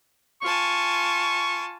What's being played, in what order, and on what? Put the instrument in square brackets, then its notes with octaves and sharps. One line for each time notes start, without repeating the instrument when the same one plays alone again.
[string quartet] F4 G#5 A5 [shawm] C#6